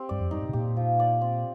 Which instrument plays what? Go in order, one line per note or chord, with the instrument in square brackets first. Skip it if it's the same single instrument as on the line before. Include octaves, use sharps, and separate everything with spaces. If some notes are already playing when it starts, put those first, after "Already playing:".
Already playing: [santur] C4 G4
[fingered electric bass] G2 [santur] D5
[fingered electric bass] F2
[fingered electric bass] G2 [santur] D#4
[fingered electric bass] A2
C3
[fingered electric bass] A#2 [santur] G4
[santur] F3
D5
C4